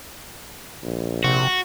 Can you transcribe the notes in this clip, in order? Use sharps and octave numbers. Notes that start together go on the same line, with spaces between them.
A#1
C3 F#4